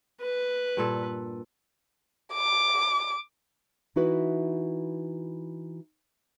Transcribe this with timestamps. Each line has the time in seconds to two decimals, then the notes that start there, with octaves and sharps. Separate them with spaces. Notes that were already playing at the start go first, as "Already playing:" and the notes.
0.21 B4
0.77 G2 A#2 A4
2.34 D6
3.96 E3 D#4 E4 F#4 B4